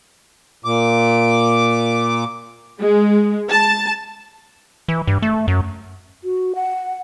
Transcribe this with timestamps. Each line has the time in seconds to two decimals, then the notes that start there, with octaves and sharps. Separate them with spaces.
0.65 A#2 D6
2.80 G#3
3.50 A5
4.88 E3
5.07 G2
5.22 A3
5.48 F#2
6.24 F#4
6.55 F#5